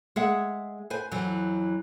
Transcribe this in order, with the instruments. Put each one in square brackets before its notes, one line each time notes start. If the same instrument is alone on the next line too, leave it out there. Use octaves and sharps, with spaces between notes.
[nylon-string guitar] G#3 G#4 E5 F#5
B4 C5 G#5
F2 E3 F#3